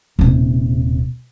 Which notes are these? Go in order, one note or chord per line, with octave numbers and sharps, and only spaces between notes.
D#1 C3